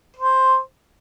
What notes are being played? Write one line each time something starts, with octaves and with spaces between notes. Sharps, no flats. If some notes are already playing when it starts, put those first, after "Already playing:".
C5